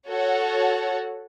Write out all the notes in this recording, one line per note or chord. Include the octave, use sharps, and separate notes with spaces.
F#4 A4 C#5 F#5